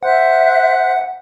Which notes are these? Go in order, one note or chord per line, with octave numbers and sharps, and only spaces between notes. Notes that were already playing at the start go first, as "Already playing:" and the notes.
C5 E5 F#5 F#6